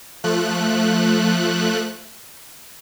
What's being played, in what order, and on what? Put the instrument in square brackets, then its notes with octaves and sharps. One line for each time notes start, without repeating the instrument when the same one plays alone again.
[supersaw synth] F3 A3 F#6